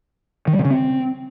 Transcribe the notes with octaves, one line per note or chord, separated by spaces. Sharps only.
D#3
G3
C3
C#3
C4